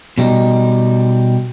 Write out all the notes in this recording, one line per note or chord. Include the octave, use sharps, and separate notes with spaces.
B2 G3 D#4